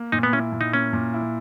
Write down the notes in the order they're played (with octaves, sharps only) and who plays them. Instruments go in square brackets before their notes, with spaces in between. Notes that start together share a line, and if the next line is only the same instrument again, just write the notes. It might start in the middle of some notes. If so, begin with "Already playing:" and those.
Already playing: [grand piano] A#3
[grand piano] A#2 [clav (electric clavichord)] D#4
[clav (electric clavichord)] B3
[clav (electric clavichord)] C#4 [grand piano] E4
[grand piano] A#2
[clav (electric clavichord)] D#4
[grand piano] A#3 [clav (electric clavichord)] C#4
[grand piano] A#2
E4